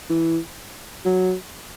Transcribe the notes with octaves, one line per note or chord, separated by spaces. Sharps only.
E3
F#3